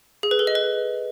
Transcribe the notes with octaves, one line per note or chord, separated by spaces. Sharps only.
G#4
B4
A4
D#5
B4